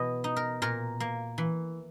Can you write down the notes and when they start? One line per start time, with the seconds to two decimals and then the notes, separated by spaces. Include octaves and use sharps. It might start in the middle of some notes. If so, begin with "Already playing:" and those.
Already playing: B2 E3 D#5
0.24 D#4
0.36 A#4
0.62 A#2 A#4
1.00 A#3
1.38 E3